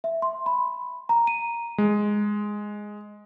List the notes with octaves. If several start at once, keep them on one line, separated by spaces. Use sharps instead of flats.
E5
C6
B5
A#5
D#7
G#3